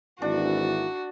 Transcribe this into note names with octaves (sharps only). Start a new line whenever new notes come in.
G#1 E3 A#3 D4 E4 F#4